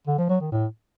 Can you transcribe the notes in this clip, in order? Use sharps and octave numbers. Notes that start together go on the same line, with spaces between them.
D3
F3
F#3
D#3
A2